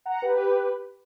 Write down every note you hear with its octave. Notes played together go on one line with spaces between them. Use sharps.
F#5 A#5
G4 B4